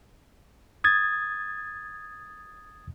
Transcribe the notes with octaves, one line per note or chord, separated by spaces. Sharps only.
D#6 G#6 A6